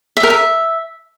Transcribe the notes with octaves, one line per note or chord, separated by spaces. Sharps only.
E5
A#4
E5